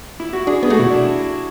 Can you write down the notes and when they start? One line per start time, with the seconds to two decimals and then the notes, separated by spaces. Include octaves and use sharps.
0.20 E4
0.33 F#4
0.47 D4 G#4
0.63 B3 G#4
0.70 A3 F#4
0.79 B2 E4
0.90 D4